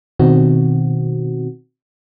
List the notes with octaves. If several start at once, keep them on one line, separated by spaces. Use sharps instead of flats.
B2 D#3 C4 F#4